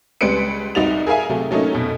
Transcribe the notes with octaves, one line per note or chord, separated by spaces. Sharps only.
C#2 G3 G#3 B4 C#7 D7
C2 D#4 F#4 A6 F7
G#4 A#4 E5 F5 G#5
C3 F#3 A3
F#3 A3 A#3 C#4 D#4
F1 B2